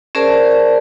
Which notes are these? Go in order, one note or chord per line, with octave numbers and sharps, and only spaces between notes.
C#4 G#4 A#4 C5 D5 A5